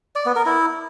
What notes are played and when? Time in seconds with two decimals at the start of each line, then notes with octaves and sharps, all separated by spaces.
0.16 D5
0.26 B3
0.36 A#4
0.46 E4